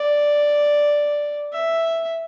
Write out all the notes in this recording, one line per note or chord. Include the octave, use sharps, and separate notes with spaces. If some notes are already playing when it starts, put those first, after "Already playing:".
Already playing: D5
E5